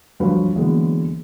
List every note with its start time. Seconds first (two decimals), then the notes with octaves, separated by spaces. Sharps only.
0.20 D2 G2 F3 F#3 B4 F5
0.56 D3 E3 F#3 G#3 A#3 B3